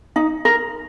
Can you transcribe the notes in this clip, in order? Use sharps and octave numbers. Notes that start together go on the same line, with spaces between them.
D#4
A#4